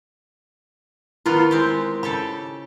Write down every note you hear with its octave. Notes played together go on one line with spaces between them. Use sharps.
D#3 B3 E4 F4
G#3 C4 G4
C#3 G4 A4 B5